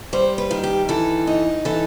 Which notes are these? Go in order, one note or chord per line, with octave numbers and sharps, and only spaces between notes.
G3 C5
B4
D#3
G4
E3 A4
D#4
E3 A4